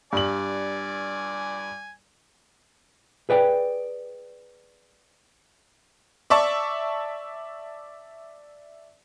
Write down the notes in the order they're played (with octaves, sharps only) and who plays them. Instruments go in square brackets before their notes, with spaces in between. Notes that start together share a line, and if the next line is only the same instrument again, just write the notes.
[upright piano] G2 F#7 [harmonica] D5 G#5
[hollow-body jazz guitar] G#4 B4 D5 G5
[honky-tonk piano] D5 E5 A5 C#6